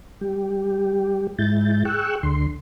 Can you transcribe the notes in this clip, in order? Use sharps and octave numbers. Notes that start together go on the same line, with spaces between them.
G3 G4
G#2 G#3 E4 G6 A6
G#4 G5 C#6 E6 F#6
D2 D3 C6